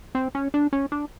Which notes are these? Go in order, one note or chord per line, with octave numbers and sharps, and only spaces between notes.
C4
C#4
D4
C#4
D4